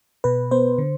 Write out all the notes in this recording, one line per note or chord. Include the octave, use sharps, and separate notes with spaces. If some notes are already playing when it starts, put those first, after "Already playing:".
B2 B4
B3 C5
D3